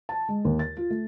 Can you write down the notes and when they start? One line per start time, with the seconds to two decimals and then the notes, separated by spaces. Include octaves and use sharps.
0.09 A5
0.29 G#3
0.45 D#2
0.59 A6
0.77 F4
0.90 A3